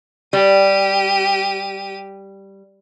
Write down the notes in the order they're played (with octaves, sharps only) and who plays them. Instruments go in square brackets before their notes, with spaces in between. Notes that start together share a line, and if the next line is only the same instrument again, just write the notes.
[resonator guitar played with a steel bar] G3 [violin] G4 D#7